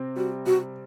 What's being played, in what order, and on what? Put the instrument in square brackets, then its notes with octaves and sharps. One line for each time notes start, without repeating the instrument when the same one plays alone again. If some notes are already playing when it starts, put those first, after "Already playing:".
Already playing: [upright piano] C3 C4
[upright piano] G3 [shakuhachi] F#4
[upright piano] C3 [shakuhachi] F#4